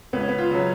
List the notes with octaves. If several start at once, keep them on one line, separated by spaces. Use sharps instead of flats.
C#2 B3
C#4
B3
F4
C#3 F#3